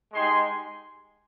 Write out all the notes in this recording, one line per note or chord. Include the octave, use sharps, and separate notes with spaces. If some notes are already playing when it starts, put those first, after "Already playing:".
G#3 D#4 G4 G#5 C6